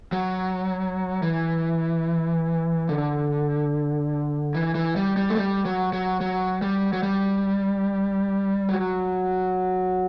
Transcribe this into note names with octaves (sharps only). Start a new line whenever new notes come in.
F#3
E3
D3
E3
E3
G3
G3
A3
G3
F#3
F#3
F#3
G3
F#3
G3
F#3